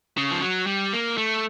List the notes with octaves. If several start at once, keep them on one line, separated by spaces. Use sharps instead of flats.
C#3
F3
F#3
G3
A#3
A3